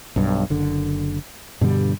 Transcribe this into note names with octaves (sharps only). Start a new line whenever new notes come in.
B1 G2
F#1 D3
G2 B2 D3 G3